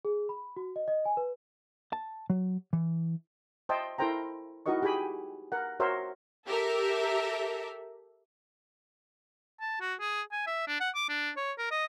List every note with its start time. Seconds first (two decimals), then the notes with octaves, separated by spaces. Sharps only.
0.05 G#4
0.29 B5
0.57 F#4
0.76 D#5
0.88 D#5
1.05 G#5
1.17 B4
1.93 A5
2.30 F#3
2.73 E3
3.69 C5 D#5 E5 G5 A5
3.98 E4 A4 A#4 C5 G5 A#5
4.66 D#4 E4 F#4 A#4 D#5 C#6
4.82 G4 G#4 G5 G#5 B5
5.52 A#4 F#5
5.80 F#4 A#4 C5 C#5 E5
6.48 G4 A4 A#4 E5
9.60 A5
9.81 F#4
10.01 G#4
10.32 G#5
10.47 E5
10.68 D4
10.80 F#5
10.95 D6
11.09 D4
11.37 C#5
11.58 A#4
11.71 D#5